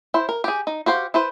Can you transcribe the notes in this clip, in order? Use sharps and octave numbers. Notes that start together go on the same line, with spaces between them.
E4 C5
A#4
G4 G#4
D#4
F#4 G4 C5 F5
E4 B4 C5